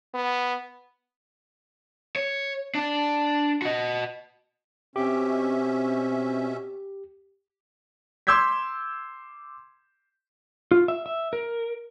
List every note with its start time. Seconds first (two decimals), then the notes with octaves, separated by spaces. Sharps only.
0.14 B3
2.16 C#5
2.75 D4 D5
3.62 F#4 D#5
4.96 B2 C4 C#4 G4 E5
8.27 C6 D6 E6 G6 G#6 B6
10.71 F4
10.88 E5
11.06 E5
11.33 A#4